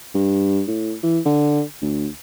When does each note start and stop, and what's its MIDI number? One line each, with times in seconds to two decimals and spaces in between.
0.14 0.62 43
0.67 0.93 45
1.03 1.19 52
1.25 1.62 50
1.82 2.07 38